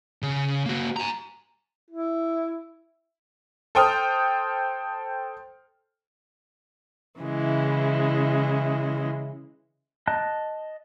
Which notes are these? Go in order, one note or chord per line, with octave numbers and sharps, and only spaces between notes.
C#3
A#3 F#4
G#5 A#5
E4
A4 C5 G5 D#6 F6
C#3 E3 G#3 E4
D#5 A5 F#6